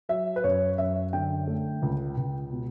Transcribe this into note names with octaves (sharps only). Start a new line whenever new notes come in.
F#3 E5
B4
F#2 C#5
F#2 E5
D3 G5
A3
C#2
C#2
B2